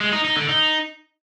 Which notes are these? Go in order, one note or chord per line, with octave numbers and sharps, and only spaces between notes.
G#3
D#4
D#4
D3
D#4